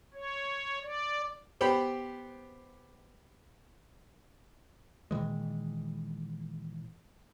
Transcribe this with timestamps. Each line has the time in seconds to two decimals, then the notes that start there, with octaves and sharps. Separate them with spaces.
0.14 C#5
0.83 D5
1.61 B3 G4 C5 G5 B5
5.11 A#2 D#3 E3 G#3